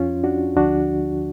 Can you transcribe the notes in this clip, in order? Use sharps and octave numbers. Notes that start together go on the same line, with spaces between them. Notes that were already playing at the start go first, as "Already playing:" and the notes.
Already playing: F2 F3 C#4 F4
D4 F#4
D2 D3 F3 D4 F#4